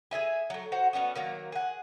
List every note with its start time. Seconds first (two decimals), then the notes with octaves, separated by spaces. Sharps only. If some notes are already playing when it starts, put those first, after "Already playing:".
0.11 G#4 A4 E5 G#5
0.50 F#3 A3
0.72 F#4 C5 F#5 A#5
0.93 G3 B3 C#4 F#4
1.15 D#3 F#3 A#3
1.52 G#4 F#5